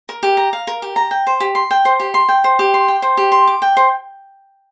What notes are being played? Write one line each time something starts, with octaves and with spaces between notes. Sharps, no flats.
A#4
G4
A#5
F5
A#4
G4
A#5
G5
C5
G4
C6
G5
C5
G4
C6
G5
C5
G4
C6
G5
C5
G4
C6
D6
G5
C5